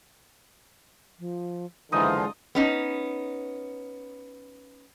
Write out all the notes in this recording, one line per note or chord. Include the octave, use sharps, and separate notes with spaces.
F3
F#1 D3 E3 F3 G#3 D#4 F4 D#6
B3 C#4 D#4